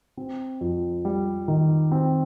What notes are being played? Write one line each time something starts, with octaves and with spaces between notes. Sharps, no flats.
C4
F2
G3
D#3
C4